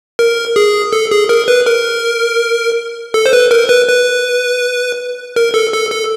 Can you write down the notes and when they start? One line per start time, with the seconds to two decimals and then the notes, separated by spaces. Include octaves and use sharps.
0.19 A#4
0.56 G#4
0.93 A4
1.11 G#4
1.29 A#4
1.48 B4
1.66 A#4
3.14 A4
3.26 C5
3.33 B4
3.51 A#4
3.69 B4
3.88 B4
5.36 A#4
5.54 A4
5.73 A4
5.91 A4